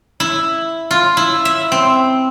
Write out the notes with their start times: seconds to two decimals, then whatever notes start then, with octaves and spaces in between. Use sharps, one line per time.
0.20 E4
0.91 F4
1.17 E4
1.45 E5
1.72 C4